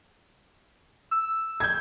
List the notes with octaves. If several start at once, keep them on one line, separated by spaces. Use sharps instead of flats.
E6
G6 G#6